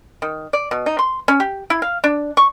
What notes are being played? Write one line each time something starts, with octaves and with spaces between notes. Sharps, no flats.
D#3
D5
B2
D#4
C6
C#4
G4
E4
F5
D4
C#6